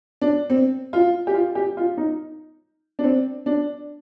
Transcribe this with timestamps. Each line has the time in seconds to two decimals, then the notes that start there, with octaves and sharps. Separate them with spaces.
0.22 D4
0.50 C4
0.93 F4
1.27 G4
1.34 F4
1.55 G4
1.77 F4
1.97 D#4
2.99 D4
3.04 C4
3.46 D4